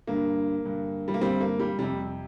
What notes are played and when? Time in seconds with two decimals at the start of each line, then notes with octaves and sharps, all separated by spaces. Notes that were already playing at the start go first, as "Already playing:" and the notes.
0.07 G2 D3 A#3
0.64 G2 D3
1.08 G3
1.14 A#3
1.21 G2 D3 G3 C4
1.41 A#3
1.59 G3
1.78 F2 C3 G3